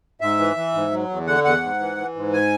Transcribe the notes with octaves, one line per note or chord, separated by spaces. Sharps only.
G#2 E5
E3
E3
G#2
F#3
E2
D3 F#5
E2 F#5
G#2
E3
E3
G#2
G#5